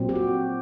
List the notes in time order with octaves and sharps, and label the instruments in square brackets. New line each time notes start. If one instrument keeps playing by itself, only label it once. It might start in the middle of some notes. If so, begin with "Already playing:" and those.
Already playing: [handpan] A#2 F#3 C4
G4
F#4